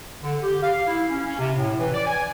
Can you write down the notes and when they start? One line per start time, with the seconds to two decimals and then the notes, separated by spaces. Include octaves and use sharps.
0.23 D3
0.43 G4
0.63 F5
0.87 E4
1.09 C#4
1.26 C#4
1.39 C3
1.55 A2
1.79 E3
1.94 D5
2.07 G#5